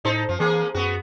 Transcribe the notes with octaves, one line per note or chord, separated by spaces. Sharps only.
A2 D#4 A4 C5
F#2 F3
E3 A#3 C4 G#4
F#2 B3 F#4